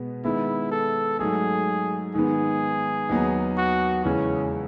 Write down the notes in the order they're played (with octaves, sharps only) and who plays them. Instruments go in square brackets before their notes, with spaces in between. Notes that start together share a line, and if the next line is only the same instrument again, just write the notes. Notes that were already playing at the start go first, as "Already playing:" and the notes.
Already playing: [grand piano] B2 G#3 B3
[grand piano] D#3 G#3 B3 [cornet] E4
[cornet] A4
[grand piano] G#2 F#3 A3 [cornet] G#4
[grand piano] G#2 D#3 G#3 B3 [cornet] G#4
[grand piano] D#2 D#3 F#3 B3 D#4
[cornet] F#4
[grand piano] E2 C#3 G#3 [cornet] C#4